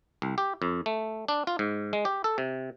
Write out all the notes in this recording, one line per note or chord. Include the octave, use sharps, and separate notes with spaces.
C2
G4
F2
A3
D4
F4
G#2
G#3
G4
A4
C3